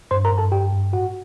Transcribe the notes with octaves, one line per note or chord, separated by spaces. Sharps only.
G2 C5 C6
A#4 A#5
G2
A4 A5
G2 G4 G5
G2
A2 F#4 F#5